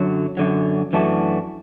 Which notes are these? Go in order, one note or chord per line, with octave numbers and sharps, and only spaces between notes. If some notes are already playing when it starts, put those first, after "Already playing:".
Already playing: F#2 D3 F#3
F#2 D3 F#3
F#2 E3 A3 D4 F#4